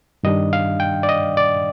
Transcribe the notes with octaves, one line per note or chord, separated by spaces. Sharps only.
G2 D#3 G3 D4 D#5
F5
G5
D5
D#5
D5